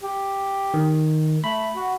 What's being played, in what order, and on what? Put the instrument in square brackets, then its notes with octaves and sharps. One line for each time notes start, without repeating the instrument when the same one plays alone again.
[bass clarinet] G4
[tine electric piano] D#3
[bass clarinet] A3 [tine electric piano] B5
[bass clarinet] F#4